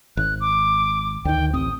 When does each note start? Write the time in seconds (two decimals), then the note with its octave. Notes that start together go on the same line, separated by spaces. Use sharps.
0.17 G#1 F#6
0.41 D6
1.25 D2 D#3 G5
1.53 A1 C4 D#6